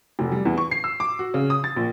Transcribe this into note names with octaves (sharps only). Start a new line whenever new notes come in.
F1
G3
E2
C#6
C7
E6
D6
F#4
C#3
D#6
A6
A#1